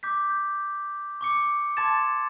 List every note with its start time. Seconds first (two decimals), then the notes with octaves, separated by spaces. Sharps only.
0.03 D6 G6 B6
0.30 G6
1.21 C#6 D6 C#7
1.77 A5 C6 D6 G#6 A6 E7